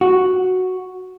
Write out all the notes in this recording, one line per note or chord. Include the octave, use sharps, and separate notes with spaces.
F#4